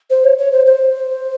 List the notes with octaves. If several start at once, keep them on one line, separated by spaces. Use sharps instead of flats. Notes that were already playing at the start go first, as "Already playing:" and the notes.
C5
C#5
C#5
C5
C5